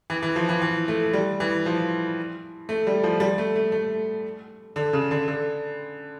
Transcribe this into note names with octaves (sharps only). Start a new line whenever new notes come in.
E3
E3
F3
E3
E3
A3
G3
E3
F3
A3
G3
F3
G3
A3
A3
A3
D3
C#3
D3
D3